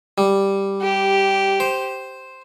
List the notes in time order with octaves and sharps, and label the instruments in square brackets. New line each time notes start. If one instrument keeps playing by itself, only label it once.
[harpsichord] G3
[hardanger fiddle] G4
[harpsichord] C5